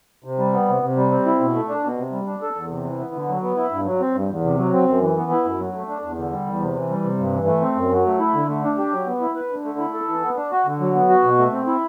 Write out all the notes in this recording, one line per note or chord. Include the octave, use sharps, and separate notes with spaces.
C3
G3
B3
C3
C3
G3
C4
E4
B2
A3
D4
B2
C3
G3
D4
A4
E2
C3
E3
B3
D3
F#3
B3
E4
G2
F#3
C4
G2
E2
C3
F#3
C4
F#2
E3
B3
E4
F#2
F#3
A3
D4
E2
D3
G3
E2
C3
E3
G3
C3
G2
E3
A3
C4
F#2
F#3
A3
E4
D3
A3
D4
G4
F#3
B3
E4
B4
D3
A3
E4
A4
E3
B3
D4
F#4
D3
F#3
B3
F#4
B2
A3
C4
E4